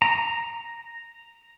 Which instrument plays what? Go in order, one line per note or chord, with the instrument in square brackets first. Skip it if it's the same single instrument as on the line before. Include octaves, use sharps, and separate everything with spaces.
[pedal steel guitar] A#5